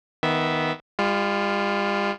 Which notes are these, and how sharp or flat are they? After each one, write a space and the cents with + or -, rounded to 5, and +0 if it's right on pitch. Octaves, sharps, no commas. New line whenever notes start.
D#3 +15 B3 +0 E5 +0
G3 +45 F4 +0